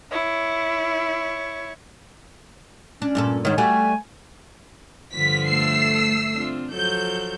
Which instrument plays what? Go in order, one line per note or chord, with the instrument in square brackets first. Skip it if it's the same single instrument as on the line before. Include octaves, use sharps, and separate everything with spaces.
[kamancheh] E4 [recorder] C#5
[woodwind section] C#4 [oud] D4
[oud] G2 A#2 A4
[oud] G#2 D#3 [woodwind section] B3 C#5
[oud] G3 A3 F#4 [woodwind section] G#5
[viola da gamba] G2 D3 F3 [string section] B6
[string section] A3 E6 C7
[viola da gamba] C4 D4 F4
[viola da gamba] F3 F#3 A4 [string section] G6